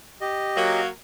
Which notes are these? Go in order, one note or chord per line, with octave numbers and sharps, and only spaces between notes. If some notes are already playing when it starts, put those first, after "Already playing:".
G4 D#5
F#3 A#3